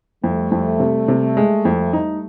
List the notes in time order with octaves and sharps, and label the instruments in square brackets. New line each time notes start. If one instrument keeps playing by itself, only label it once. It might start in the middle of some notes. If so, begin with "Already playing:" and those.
[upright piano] F2 [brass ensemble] G3 A3
[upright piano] F2
C3
C3
G#3
F2
[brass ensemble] G3 A3 [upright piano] D#4